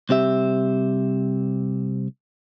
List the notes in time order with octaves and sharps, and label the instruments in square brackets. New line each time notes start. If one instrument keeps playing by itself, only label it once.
[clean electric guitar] C2 C4 G4 E5